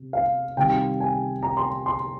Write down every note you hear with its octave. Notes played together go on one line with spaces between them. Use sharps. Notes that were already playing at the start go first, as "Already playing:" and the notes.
Already playing: C3
F5
C3 D#3 G3 G5
G#5
A#5
C6
C6